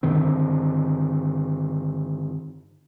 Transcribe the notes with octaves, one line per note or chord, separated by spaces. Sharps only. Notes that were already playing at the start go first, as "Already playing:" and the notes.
G2 D3 D#3 C4